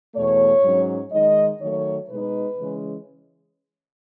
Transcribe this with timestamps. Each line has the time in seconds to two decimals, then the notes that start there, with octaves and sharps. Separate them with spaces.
0.14 E2 B2 A3 C#5
0.64 G#2 F#3 C#4
1.12 D#3 G#3 D#4 D#5
1.60 D#3 F#3 A3 C#5
2.09 B2 G#3 D#4 B4
2.57 C#3 E3 G#3 C#4